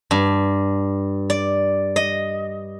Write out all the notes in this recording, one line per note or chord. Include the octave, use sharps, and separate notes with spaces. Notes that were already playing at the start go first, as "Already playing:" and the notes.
G2
D5
D#5